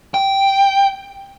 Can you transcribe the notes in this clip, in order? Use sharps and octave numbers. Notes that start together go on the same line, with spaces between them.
G5